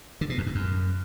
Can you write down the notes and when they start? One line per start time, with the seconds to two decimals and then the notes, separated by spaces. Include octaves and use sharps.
0.21 D3
0.30 B2
0.38 F2
0.46 G#2
0.55 F#2